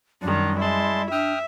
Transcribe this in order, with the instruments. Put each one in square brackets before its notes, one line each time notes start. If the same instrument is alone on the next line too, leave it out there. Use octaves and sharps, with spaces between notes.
[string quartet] F#2 D#3 [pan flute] G3 [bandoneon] D4
[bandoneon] G#3 A5 C6 [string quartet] E4
[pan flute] D4 [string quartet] E5 [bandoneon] G5 D#6 F6